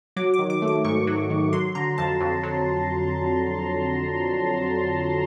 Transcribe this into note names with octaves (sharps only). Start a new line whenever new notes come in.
F#3 D6
D6
D#3
D6
A3
D6
G#2 C#6
F#3
D#3
F#3 C6
D3 A#5
F2 A5
F2
F#3